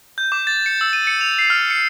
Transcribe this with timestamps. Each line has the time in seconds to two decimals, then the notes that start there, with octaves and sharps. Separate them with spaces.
0.18 G6
0.32 D6
0.47 A6
0.66 C#7
0.81 E6
0.93 D#7
1.07 C#7
1.21 F7
1.39 C7
1.50 F6
1.70 C#7